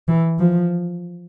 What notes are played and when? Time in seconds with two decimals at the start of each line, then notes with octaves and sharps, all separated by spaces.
0.08 E3
0.39 F3